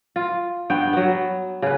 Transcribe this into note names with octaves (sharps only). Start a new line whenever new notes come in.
F4
G2 B3 G5
F#3 B3
C#3 B4